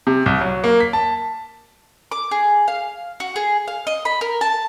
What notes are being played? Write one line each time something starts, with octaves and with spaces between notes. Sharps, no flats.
C3
C2
F#3
A#3
B6
A5
D6
G#4
F5
F#4
G#4
F5
D#5
B5
A#4
A5